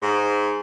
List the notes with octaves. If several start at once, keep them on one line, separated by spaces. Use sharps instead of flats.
G#2